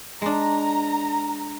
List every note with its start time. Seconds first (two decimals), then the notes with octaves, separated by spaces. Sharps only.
0.22 G#3 D4 A#5